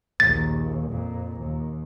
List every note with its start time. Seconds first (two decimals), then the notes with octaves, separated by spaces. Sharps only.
0.20 A#1 D#2 A6
0.88 F2 A#2
1.41 D#2